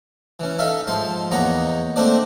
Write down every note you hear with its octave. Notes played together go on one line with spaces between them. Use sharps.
E3 C#4
D#4 A4 E5 F5
G#2 F3 A5 C6
E2 A#3 B3 D#4 C#5 A#5
A3 A#3 C4 D4 C5 D5